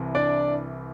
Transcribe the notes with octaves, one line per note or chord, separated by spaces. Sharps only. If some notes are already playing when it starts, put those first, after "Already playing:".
Already playing: C2 C3 E3
D4 D5